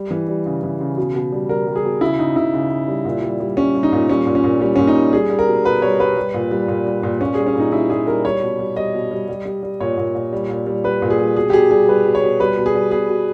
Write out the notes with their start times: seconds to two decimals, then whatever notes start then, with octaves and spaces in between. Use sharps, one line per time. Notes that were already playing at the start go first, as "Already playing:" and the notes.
Already playing: G3
0.11 E3
0.28 G3
0.46 C#3
0.63 E3
0.81 C#3
0.97 B2
1.15 B2
1.32 G3
1.49 G3 A#4
1.67 G3
1.76 G#4
1.84 B2
2.01 C#3 E4
2.19 C#3 D#4
2.36 C#3 E4
2.54 C#3
2.71 C#3
2.88 G3
3.05 A#2
3.22 G3
3.40 G3
3.57 G3 C#4
3.75 G3
3.83 D#4
3.92 A#2
4.09 G3 C#4
4.27 A#2
4.35 C#4
4.44 A#2
4.61 G3 C#4
4.76 A#2 C#4
4.87 D#4
4.96 G3
5.13 G3 G#4
5.30 G3
5.39 A#4
5.47 B2
5.64 B2 B4
5.82 G3 C#5
6.00 G3 B4
6.16 G3
6.34 A#2
6.51 G3
6.68 A#2
6.86 G3
7.03 A#2
7.21 A#2 C#4
7.34 G3 G#4
7.47 C#4
7.55 A#2 D#4
7.72 G3 E4
7.90 A#2 G#4
8.07 G3 A#4
8.24 G3 C#5
8.42 B2
8.59 G3
8.76 G3 D#5
8.94 B2
9.11 G3
9.28 G3
9.45 G3
9.63 G3
9.80 A#2 C#5
9.97 A#2
10.15 A#2
10.33 G3
10.49 A#2
10.67 G3
10.84 G3 B4
11.02 A#2
11.10 G#4
11.19 G3
11.36 B2 G#4
11.50 G4
11.53 B2 G#4
11.70 G3 G#4
11.88 G3 B4
12.06 B2
12.15 C#5
12.23 B2
12.40 G3 B4
12.57 B2
12.66 G#4
12.75 G3
12.91 B2 G#4
13.09 B2